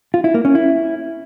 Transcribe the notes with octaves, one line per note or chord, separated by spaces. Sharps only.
F4
E4
A#3
C#4
E4